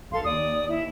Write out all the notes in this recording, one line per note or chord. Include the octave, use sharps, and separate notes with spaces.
B1 A4 F5 C6
D#2 D5 D#6
E4